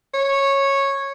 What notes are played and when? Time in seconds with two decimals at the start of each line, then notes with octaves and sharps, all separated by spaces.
0.14 C#5